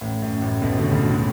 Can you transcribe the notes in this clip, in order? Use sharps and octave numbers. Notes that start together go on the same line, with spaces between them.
A1 A2
F#2
A1 A2
B1 B2
D2 D3
C#2 C#3
D3